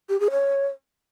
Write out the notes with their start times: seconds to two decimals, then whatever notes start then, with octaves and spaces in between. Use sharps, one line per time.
0.09 G4
0.20 G#4
0.31 C#5